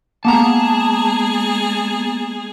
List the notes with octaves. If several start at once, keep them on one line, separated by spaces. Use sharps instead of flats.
G#3 A#3 B3 G#4 A5 A#5